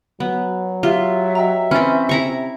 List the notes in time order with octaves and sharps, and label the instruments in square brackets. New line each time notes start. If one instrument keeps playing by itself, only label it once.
[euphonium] F#3 [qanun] B3
[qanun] F4 [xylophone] G4 [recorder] E5
[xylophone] D#5 G5 A#5 [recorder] E5
[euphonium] E3 [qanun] C4 C#4 [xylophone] B5 A6
[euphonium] C3 [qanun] E4 A#5 C#6